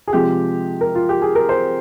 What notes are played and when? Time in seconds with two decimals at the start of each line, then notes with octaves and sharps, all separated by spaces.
0.08 G#4
0.13 C3 F3 G#3 G4
0.81 A#4
0.95 F4
1.09 G4
1.22 G#4
1.35 A#4
1.49 C5